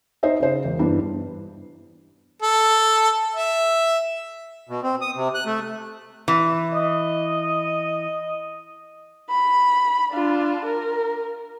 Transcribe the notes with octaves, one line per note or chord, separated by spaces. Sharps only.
D#4 C5 D#5 E5
C#3 C5
E1
G2 E3 B3 D4
A4
E5
B2
C4
D#6
C3
F#6
A3
E3
D#5
B5
D4 F4
A#4